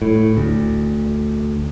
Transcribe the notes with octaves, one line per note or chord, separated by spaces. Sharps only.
A2
D2